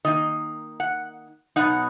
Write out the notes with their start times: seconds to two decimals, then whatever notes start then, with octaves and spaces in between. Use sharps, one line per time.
0.05 D#3 A#3 D#4 D#5
0.80 F#5
1.56 B2 F#3 B3 D#4 F#5